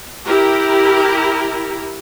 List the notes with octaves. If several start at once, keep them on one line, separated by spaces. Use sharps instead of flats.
E4 G4 A#4